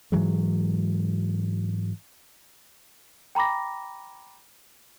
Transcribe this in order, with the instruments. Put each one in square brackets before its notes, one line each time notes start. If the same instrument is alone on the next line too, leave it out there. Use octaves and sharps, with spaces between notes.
[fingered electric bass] G#2 E3 F#3 G#3
[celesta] G5 A#5 B5 D6 A#6